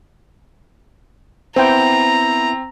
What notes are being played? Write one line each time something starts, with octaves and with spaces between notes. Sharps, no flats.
B3 C4 E4 C5 G5 A#5